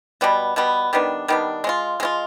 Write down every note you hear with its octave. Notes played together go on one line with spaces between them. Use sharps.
B2 G3 B3
B2 G3 B3
D#3 G3 B3 D4
D#3 G3 B3 D4
G#3 C#4 F4
G#3 C#4 F4